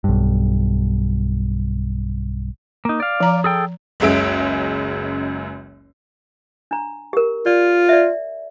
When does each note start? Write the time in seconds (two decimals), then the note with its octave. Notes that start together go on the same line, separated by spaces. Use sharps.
0.04 B1 G2
2.85 A#3 D#4
3.00 D5 F5
3.20 F3 A#5
3.44 G#4 A4 G5
4.00 F#1 C#2 F#2 G#3 E5 D7
6.71 D4 A#5
7.13 G4 A#4
7.46 F4 D5
7.89 D5 E5